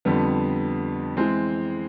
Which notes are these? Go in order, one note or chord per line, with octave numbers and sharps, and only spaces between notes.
F2 D3 G3 B3
E3 G#3 C4